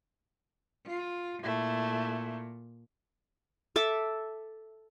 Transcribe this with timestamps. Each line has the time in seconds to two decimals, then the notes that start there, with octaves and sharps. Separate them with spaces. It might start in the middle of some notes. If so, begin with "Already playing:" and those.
0.86 F4
1.43 A#2 A3 E4
3.76 A4 E5 D6